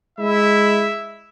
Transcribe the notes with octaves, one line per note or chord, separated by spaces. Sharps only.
G#3 E4 E5